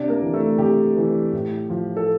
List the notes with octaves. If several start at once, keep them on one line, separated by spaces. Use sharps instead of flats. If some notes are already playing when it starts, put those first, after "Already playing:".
Already playing: C3 D4 D5
A#3 A#4
E3
A3 A4
C3 G4
E3
A2
F3
A4